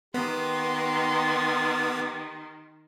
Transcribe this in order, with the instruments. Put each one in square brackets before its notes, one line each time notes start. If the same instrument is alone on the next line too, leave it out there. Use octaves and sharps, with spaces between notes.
[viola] D#3 [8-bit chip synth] B3 [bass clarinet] G4 [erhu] C6